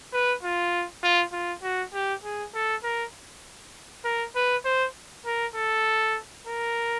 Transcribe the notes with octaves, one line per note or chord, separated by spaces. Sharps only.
B4
F4
F4
F4
F#4
G4
G#4
A4
A#4
A#4
B4
C5
A#4
A4
A#4